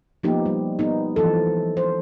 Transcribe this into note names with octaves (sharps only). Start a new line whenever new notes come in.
F3 A#3 B3 D#4 G4
G3
B3 D#4
E3 F3 A4
C5